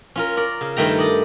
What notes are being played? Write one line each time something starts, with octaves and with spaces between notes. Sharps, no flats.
C#4 F4 A#4
A#4 D5
C#3
G2 D#3 A3 G5 A#5
D5 D#5